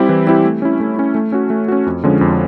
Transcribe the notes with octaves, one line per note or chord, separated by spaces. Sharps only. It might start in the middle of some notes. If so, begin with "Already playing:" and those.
Already playing: G3 C4 E4 G4
E3
G3 C4 E4 G4
A3
C#4 E4
A3
C#4 E4
A3
C#4 F#4
A3
C#4 F#4
F2
D3 F3 G#3 C#4
F2